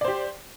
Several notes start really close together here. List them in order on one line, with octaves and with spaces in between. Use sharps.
D5 C5 G4